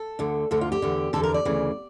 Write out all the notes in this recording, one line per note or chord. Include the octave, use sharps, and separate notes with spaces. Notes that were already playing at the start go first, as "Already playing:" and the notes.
Already playing: A4
D2 D3
D2 D3 A4
F4
G4
E2 D3
E2 D3 A4
A#4
D5
D2 C#3 E3